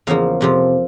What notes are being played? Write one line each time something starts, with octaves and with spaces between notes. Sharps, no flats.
E2 C#3 F3 A#3 F5
F2 C3 F3